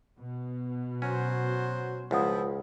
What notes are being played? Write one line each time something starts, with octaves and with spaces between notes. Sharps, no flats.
B2
F#3 C#4 F#4 C5
C#2 F3 E4 C5 F#5 D#6